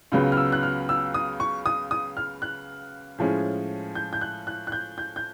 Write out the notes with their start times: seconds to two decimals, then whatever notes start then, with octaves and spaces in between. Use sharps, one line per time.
0.12 C#2 C#3 F#3 B3
0.32 F6
0.37 E6
0.52 F#6
0.63 F6
0.89 E6
1.14 D#6
1.40 C#6
1.66 D#6
1.91 D#6
2.17 F6
2.42 F#6
3.18 A2 F3 G#3 C#4
3.95 G6
4.13 G6
4.21 F#6
4.47 F#6
4.67 F#6
4.72 G6
4.98 G6
5.16 G6